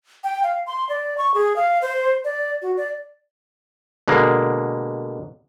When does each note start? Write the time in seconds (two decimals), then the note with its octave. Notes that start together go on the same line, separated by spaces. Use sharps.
0.24 G5
0.43 F5
0.67 C6
0.89 D5
1.18 C#6
1.34 G#4
1.56 F5
1.82 C5
2.24 D5
2.62 F#4
2.77 D5
4.08 B2 D3 G#3 A#3